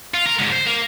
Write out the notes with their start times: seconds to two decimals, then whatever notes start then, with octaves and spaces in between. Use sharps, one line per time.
0.14 F4
0.26 A#4
0.39 G#2 D3
0.52 C5
0.67 A#3